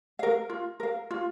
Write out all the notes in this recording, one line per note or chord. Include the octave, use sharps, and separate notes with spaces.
A#4 F5
F4
A#4 F5
F4